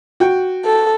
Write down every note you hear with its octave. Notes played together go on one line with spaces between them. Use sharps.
F#4 G5
A4